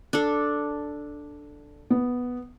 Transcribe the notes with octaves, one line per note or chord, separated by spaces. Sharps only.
D4 A4
B3